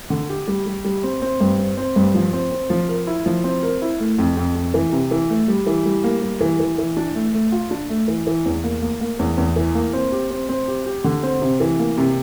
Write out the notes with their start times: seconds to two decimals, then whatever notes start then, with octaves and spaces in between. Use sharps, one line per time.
0.10 D3
0.29 G4
0.48 G3
0.66 G3
0.85 G3
1.03 C4
1.22 C4
1.40 G2
1.59 C4
1.77 C4
1.96 G2
2.14 F3
2.33 C4
2.52 C4
2.70 F3
2.89 A#4
3.07 E4
3.26 F3
3.44 C4
3.63 A#4
3.82 E4
4.00 A3
4.18 F2
4.37 F2
4.55 F2
4.74 E3
4.93 C3
5.11 E3
5.30 A3
5.48 G3
5.67 E3
5.85 G3
6.04 A#3
6.22 G3
6.41 E3
6.60 E3
6.78 E3
6.97 D4
7.15 A3
7.34 A3
7.52 F4
7.71 D4
7.89 A3
8.08 E3
8.27 E3
8.46 E2
8.64 A#3
8.82 A#3
9.01 A#3
9.19 E2
9.38 E2
9.56 E3
9.75 A#3
9.93 C4
10.12 G4
10.30 C4
10.49 C4
10.68 G4
10.86 G4
11.04 D3
11.23 C4
11.42 C3
11.60 E3
11.79 A#3
11.98 C3